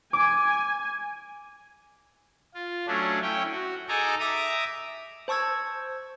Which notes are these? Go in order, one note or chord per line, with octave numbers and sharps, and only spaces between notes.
G#5 D6
F4
F#3 A3 C#4 D4
C#4 E4 C#5 G5
F#4
D#4 G#4 A4 G#5 A#5 D6
E5 A#5 D6 D#6
C5 A5 C#6 E6 G#6